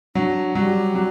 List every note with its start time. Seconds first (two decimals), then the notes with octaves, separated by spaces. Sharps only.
0.15 F#3 D4
0.55 F#3 G3
0.95 F#3